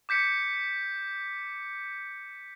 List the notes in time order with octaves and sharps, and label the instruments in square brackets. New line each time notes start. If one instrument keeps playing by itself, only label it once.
[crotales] D6 G6 B6 C#7